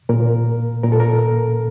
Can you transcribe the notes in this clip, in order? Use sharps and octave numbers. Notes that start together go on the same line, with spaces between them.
A#2 A#4
A#2 A#4
A4
A#4